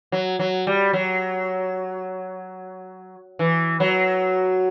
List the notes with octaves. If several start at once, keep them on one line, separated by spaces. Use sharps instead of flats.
F#3
F#3
G3
F#3
E3
F#3